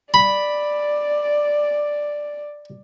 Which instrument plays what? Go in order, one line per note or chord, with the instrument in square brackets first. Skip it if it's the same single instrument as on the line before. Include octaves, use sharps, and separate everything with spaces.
[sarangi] D5 [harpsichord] B5